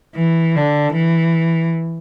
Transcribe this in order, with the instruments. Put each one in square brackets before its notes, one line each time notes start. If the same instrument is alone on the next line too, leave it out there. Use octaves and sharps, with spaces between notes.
[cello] E3
D3
E3